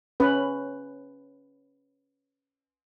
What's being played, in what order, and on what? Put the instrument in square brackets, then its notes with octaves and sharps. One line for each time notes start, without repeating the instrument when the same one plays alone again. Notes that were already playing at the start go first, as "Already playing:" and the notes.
[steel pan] C#4 B4